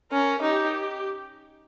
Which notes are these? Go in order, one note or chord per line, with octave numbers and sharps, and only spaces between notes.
C#4 A#4
D#4 G4